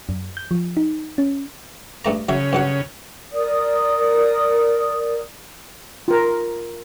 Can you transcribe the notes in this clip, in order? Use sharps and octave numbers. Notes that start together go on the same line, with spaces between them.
F#2
G6
F3
D#4
C#4
G2 A3 A#5
C#3 F#3 E5
G2 F#3 F#5
A#4 D5 D#6
F4 A#4